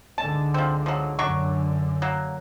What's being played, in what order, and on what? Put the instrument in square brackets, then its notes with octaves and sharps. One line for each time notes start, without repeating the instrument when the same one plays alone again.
[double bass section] C#2 G#2 D3 [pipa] A5
[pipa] F3 C4
F3 F#3
[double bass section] F#2 D3 [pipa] F#3 D4 C#6
[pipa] F#3 A#3